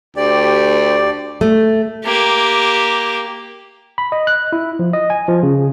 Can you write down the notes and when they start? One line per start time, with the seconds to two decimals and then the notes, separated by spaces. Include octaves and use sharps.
0.17 D2 G4 D5
1.41 A3
2.05 A#3 G4
3.98 B5
4.12 D#5
4.27 F#6
4.52 E4
4.79 F3
4.93 D#5
5.10 G#5
5.28 F3
5.43 C#3